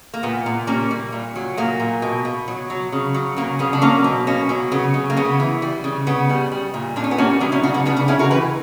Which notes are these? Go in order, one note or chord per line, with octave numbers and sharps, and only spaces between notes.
A#3
A#2 B3
A#2
G3 A#3 C#4
G3
A#2
F#3
A#2 A#3
A#2
B2
B2
F#3
F#3
C#3
F#3
C#3 A#3
C#3 B3
D4
F#3 A#3 C#4
B2
B2 A#3 C#4
F#3
C#3 B3
C#3
A#3
C#3 B3
E3
G3
C#3
C#3 B3
G3
G3
A#2
A#2 D4
C#4
B3
G3 A#3 C#4
F#3 B3 D4
C#4 E4
C#3 D4 F#4
B3 D4
C#3 B3 D4
B3 D4
C#3 C#4 E4
F#4 A#4
E3 G4 B4